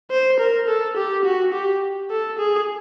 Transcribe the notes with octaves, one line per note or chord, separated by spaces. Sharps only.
C5
A#4
A4
G4
F#4
G4
A4
G#4